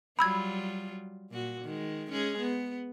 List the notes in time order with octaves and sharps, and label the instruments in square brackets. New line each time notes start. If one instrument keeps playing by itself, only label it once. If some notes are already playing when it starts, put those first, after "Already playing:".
[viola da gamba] F#3 G3 F4 [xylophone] B5 E6 G#6
[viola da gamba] A#2 F#4
D#3 G#3
G#3 C#4 G#4
B3